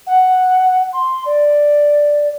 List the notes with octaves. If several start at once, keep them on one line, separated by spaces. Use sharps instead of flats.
F#5
C6
D5